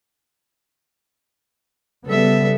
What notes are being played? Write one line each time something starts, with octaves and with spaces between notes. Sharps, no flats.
C#3 G3 B3 A4 E5